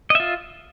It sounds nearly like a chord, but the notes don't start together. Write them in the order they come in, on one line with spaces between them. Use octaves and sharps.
D#5 E5 F4